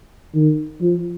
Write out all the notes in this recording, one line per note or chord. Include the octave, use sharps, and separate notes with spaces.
D#3
F3